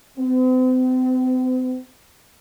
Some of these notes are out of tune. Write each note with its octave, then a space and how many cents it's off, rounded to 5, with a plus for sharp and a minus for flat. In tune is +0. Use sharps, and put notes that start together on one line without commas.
C4 -40